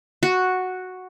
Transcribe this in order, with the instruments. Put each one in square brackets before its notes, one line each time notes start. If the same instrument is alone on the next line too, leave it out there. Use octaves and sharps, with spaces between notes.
[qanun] F#4